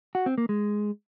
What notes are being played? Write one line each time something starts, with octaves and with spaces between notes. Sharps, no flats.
F#4
C4
A#3
G#3